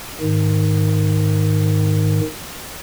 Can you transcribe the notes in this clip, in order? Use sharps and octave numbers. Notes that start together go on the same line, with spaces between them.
G#2 D#3